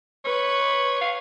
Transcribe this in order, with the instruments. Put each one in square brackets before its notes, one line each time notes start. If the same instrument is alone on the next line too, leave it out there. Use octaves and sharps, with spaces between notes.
[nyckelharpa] B4 [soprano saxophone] C#5
[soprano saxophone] F5